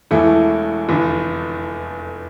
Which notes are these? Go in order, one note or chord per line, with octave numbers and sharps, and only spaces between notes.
E1 E2 E3 A3
F1 E2 D3